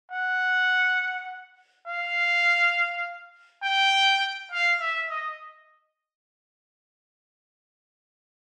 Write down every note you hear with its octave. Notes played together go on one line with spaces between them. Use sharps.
F#5
F5
G5
F5
E5
D#5